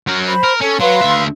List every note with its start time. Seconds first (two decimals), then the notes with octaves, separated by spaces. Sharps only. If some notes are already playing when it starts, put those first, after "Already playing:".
0.07 F#3 A#4
0.28 C5 B5
0.44 A#4
0.61 C#4 A4
0.80 F#3 B4 F5 C6
1.01 D2 E5